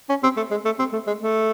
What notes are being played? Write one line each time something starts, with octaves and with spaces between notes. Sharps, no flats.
C#4
C4
A3
G#3
A3
C4
A3
G#3
A3